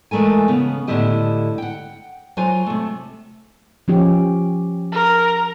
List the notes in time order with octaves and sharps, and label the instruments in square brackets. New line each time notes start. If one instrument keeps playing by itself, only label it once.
[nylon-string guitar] E3 G#3 A3 A#4 G#5
C#3 B3
A2 D3 B3 E4 G4 D#5
F#5 G5
F#3 F4 C5 G#5
C3 A3
[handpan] F3 C#4 G4
[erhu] A#4